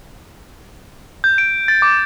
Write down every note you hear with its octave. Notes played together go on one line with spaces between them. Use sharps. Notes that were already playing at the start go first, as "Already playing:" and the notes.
G6
D7
A6
D6